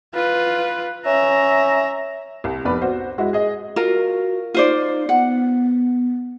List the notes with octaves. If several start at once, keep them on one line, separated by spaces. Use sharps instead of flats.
F4 B4
C#4 E5 A#5
C2
F1 B3 B4 D5 B5
F#4 C5
G#3 E4 F#4
G#4 D#5
F4 F#4 A#4
D#4 F4 C5 D5
B3 F#5